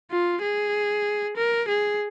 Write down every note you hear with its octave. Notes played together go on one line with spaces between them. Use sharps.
F4
G#4
A#4
G#4